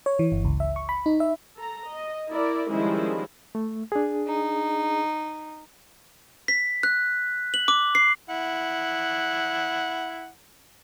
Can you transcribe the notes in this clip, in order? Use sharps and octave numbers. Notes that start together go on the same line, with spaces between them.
C#5
E3
G1
C#2
E5
C#6
B5
D#4
E5
A4 A#5
D#5
E4 A#4 D5
D#3 F3 G3 G#3 C#4 E4
A3
D4 G#4
D#4
B6
F#6
F#7
D6
C7
E4 F#5